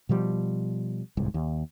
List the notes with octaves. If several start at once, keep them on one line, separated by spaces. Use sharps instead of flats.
B2 F3 G3
D1 C2 G#2
D#2